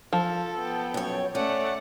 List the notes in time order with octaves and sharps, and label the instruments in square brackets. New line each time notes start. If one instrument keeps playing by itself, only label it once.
[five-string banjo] F3 [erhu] A4
[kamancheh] B3 G5
[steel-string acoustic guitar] F#2 C#5
[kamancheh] A3 D5 [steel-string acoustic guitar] C#4 [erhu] F#5